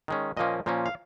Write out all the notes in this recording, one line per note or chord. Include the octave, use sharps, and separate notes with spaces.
D#3 G#3 C#4
A#2 F3 A#3 C#4 D#5
A#2 F3 A#3 C#4
F5